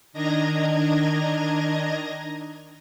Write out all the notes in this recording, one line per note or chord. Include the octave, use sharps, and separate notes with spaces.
D#3 D4 D#5 A#5 G#6 A#6